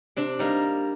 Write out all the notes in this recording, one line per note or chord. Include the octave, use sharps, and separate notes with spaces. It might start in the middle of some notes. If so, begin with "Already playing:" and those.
C3 D4
G3 A#3 D#4